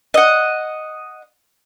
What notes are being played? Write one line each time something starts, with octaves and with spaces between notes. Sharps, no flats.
D#5 F#5